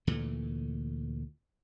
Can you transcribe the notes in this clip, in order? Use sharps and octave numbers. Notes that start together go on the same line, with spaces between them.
D2 A#2 E3 A3